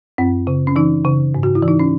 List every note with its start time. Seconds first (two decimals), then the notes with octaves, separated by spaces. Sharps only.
0.18 F#2 C4
0.47 C#3
0.67 C#4
0.76 E3 D#4
1.05 C#3
1.35 G#2
1.43 F#4
1.55 E4
1.63 E3
1.68 D#4
1.79 C#4